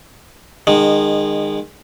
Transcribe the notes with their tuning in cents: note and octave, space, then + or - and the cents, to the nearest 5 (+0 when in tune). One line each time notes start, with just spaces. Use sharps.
D#3 -30 G#3 -20